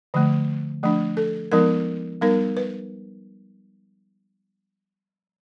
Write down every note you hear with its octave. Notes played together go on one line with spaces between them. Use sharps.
D3 F3 A3
F3 A3 D4
A4
F3 G#3 B3 D#4 A#4
G3 B3 D#4 A#4
B4